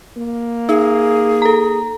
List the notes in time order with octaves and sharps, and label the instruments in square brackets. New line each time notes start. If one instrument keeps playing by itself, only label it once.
[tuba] A#3
[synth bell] D#4 [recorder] G#4
[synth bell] A4 A#5